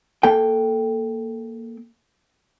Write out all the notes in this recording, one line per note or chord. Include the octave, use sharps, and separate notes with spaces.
A#3 A4 G5